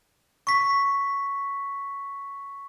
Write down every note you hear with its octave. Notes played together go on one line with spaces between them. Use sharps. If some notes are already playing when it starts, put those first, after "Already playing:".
C#6 B6